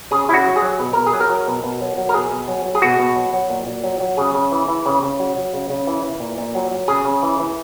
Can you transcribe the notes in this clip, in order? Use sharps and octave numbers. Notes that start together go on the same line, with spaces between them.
C#3 G#4
C#3 E4
F#4
F#3
G#4
F#3
B2
B2 A#4
G#4
F#3
A#4
F#3
B2
B2
F#3
F#3
A#4
B2 G#4
B2
F#3
F#3
G#4
B2 F#4
B2
F#3
F#3
A#2
A#2
F#3
F#3
C#3 G#4
C#3
E3
E3
C#3
C#3
F#3
F#3
C#3
C#3
E3
E3
A#2
A#2
F#3
F#3
C#3 G#4
C#3
E3
E3